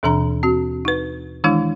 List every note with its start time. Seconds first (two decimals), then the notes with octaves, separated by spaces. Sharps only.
0.03 D#2 B2 E3 D4 A#5
0.43 C4 F#4
0.85 D#4 B4
1.44 D#3 E3 G#3 D4 E4